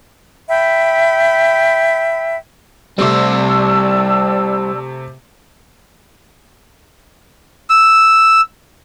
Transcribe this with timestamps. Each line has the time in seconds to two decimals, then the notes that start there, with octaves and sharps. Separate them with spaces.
0.48 E5 G5 B5
2.99 C3 G3 A3 C4 C5 D5 A5 E6
7.70 E6